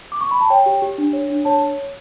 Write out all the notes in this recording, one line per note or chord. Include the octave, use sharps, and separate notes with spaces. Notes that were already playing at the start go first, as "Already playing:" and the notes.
D6
C#6
B5
A5
C#5 G5
G4
G4
D4
C#5
D4
C#5 A5